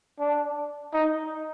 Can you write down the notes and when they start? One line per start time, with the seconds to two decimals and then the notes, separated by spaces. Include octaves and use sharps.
0.19 D4
0.93 D#4